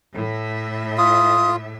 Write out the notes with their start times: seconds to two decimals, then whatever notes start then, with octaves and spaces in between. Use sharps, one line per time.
0.14 A2 E5
0.98 F4 D#6